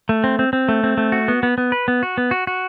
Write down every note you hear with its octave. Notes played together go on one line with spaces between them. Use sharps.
A3
C4
C4
C4
A3
C4
A3
F#4
B3
B3
B3
B4
B3
F#4
B3
F#4
F#4